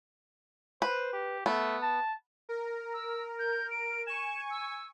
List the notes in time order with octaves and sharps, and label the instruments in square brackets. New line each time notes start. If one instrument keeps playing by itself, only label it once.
[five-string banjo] B4 [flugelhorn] C5
[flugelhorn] G4
[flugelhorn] A3 [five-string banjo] B3
[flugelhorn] A5
[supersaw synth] A#4
[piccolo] E6
G6
D7
[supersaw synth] G#5 C#6 [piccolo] E7
[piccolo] E6